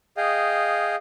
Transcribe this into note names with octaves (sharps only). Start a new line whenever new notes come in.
G#4 D#5 F5 G5